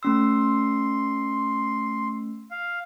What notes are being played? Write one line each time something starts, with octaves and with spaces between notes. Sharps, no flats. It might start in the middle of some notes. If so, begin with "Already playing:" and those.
A3 C#4 C6 E6
F5